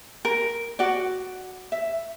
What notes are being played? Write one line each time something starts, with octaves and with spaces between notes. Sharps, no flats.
A#4
F#4 D5
E5